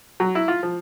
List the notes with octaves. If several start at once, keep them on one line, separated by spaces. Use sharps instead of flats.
F#3
E4
F4
F3